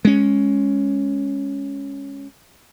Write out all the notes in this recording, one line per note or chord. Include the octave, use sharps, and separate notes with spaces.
G#3 C#4